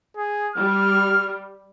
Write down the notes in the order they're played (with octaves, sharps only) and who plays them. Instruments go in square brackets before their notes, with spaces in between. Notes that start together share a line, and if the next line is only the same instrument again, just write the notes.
[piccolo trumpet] G#4
[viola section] G3 [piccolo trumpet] F6